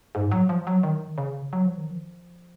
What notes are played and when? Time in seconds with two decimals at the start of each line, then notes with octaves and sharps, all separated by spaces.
0.15 G#2
0.32 F#3
0.49 F3
0.67 F#3
0.83 D#3
1.18 C#3
1.53 F#3
1.66 F3
1.78 D#3
1.91 F3